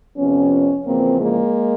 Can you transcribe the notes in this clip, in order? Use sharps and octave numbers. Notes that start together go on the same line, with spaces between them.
F2 C3 F3 B3 C#4
E2 C#3 F3 A#3 C4
G#3 A#3